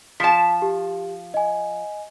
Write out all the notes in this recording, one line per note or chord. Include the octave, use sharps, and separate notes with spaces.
F3 A5 B6 E7
G4
D#5 G#5